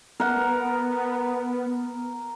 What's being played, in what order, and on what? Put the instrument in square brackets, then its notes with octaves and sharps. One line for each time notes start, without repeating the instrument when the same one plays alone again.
[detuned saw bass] B3 [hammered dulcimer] A#4 F#5